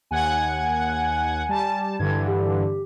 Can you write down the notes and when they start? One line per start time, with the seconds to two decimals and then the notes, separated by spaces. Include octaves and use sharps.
0.11 D#2 F#5 G#5 G#6
1.49 G3 A5
1.99 G2 D3 E3 G#6
2.28 G4